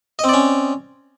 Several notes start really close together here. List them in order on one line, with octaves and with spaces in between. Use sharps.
D#5 C4 D5 C#4